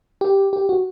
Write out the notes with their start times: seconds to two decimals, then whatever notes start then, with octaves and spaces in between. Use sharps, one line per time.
0.21 G4
0.53 G4
0.69 F#4